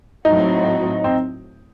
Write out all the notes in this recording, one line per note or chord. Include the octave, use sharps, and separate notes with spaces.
A2 F#3 C4 D#4 F#4
C4